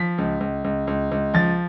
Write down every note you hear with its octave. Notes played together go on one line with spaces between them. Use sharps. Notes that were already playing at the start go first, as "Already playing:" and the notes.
Already playing: F3 B6
C#2
C#2
C#2
C#2
C#2
F3 A6